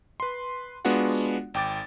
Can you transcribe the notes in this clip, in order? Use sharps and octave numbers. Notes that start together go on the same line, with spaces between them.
B4 C6
G#3 B3 D4 F4 F#4 F#5
G#1 G5 D6 A6